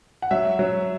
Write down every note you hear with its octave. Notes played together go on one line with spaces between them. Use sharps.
F#5
F#3 E5
F#3